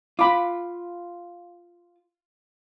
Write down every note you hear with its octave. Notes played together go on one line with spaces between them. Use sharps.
F4 B5 D6